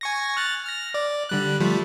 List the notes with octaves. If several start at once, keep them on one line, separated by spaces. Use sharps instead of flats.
G#5 C#6 A#6
F6 F#6 A6
F6 A#6
D5
D3 G3 F#6
F3 G3 A3